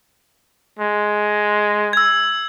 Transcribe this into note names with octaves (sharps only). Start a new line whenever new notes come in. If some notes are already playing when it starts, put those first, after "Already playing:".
G#3
E6 G#6